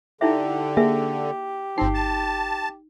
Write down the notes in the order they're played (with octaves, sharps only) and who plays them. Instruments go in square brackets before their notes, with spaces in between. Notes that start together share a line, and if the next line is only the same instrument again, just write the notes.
[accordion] D3 [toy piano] D#4 E4 E5 [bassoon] G4
[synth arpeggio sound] A#3 G#4 [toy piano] E5
[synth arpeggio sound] G1 C7 [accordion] F3 C4 [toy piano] D#4
[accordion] A5